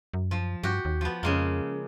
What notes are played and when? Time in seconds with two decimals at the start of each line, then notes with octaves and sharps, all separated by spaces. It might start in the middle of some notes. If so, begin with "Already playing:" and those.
0.14 F#2
0.31 F3
0.63 G2 F#4 G4
0.85 D#2
1.01 F3 B3
1.23 F2 C#3 G#3 A#3